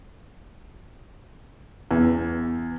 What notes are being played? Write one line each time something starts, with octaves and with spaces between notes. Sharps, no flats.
E2